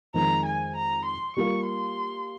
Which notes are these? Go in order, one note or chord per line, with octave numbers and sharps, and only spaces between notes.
F2 D#3 G#3 D#4 A#4 A#5
G#5
A#5
C6
G3 A#3 F4 A#4 F5 C#6
C6